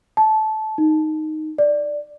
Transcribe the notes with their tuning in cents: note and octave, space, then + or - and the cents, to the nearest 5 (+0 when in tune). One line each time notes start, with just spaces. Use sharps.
A5 -20
D#4 +0
D5 +5